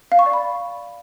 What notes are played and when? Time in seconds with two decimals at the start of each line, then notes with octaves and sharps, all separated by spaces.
0.12 F5
0.19 C#6
0.26 D5
0.33 B5